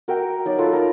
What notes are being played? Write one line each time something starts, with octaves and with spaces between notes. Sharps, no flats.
F#4 A#4 E5 G5
F#3 D#4 D5
F4 A4 B4
A#4 A#5